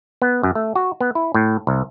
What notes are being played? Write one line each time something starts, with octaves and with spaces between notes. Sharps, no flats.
B3
F#2
A3
F#4
B3
E4
A2
C2